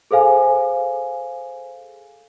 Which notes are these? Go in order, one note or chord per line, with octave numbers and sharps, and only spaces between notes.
G#4 A4 C5 F5 G#5